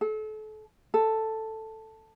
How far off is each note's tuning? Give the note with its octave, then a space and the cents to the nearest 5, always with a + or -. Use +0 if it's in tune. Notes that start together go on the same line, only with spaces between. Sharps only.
A4 -35
A4 +5